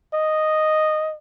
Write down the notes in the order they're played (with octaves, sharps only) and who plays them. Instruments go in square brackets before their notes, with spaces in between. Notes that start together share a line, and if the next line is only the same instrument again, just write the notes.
[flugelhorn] D#5